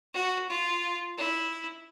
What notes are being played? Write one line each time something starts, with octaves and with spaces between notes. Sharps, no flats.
F#4
F4
E4